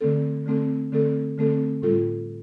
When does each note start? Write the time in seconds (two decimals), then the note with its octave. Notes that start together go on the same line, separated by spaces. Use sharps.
0.01 D3 A3 C4 A4
0.46 D3 A3 C4 A4
0.92 D3 A3 C4 A4
1.38 D3 A3 C4 A4
1.82 A2 G3 F4 A4